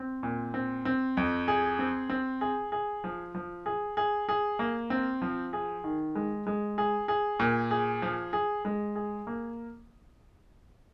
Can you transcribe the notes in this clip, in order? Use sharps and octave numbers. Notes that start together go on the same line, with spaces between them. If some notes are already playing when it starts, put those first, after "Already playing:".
Already playing: C4
A#2
C4
C4
F2
G#4
C4
C4
G#4
G#4
F3
F3
G#4
G#4
G#4
A#3
C4
F3
G#4
D#3
G#3
G#3
G#4
G#4
A#2
G#4
F3
G#4
G#3
G#4
A#3